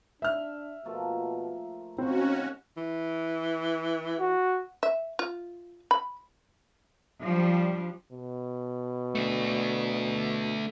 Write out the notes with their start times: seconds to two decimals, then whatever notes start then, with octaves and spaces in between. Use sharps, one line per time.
0.22 D4 E5 F6
0.85 B2 F3 A3 A#3
1.98 D#2 C4 C#4 F#4
2.77 E3
4.20 F#4
4.83 E5
5.19 F4
5.91 B5
7.23 F3 G3 D4
8.11 B2
9.15 A3 D4